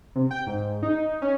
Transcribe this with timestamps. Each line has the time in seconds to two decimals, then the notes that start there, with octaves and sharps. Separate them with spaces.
0.15 C3
0.31 G5
0.47 G#2
0.83 D#4
1.22 C#4